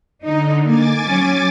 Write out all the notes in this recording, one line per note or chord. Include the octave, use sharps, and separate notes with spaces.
D3 D#4
A#3 G#5 D6 A6
F#3 C#4